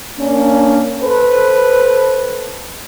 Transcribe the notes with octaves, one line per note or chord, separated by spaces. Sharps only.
A#3 C#4 D4
A4 B4 C5